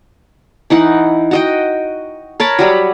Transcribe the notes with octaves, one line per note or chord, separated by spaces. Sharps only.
E3 D#4 F#5
F#4 D#5 G5
A#4 C#5 A5 B5
F#3 G3 B5